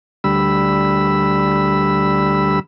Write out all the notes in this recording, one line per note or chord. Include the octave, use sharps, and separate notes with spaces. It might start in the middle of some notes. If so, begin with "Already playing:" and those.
D2 G3 B5 E6